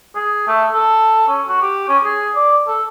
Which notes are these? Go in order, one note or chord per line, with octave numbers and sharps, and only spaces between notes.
G#4
A3
A4
C#4
F#4
G4
C#4
G#4
D5
A4